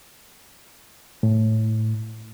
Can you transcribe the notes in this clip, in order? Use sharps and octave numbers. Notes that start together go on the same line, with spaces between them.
A2